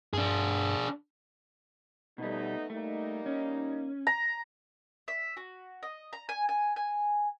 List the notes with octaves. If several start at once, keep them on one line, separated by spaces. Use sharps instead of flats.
G2 D4 G#4
B2 G3 A3 B3 D#4
G3 A3 A#3 D#4
C#4
A#5
E5
F#4
D#5
A#5
G#5
G#5
G#5